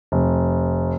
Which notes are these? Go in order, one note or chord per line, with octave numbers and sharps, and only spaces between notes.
F1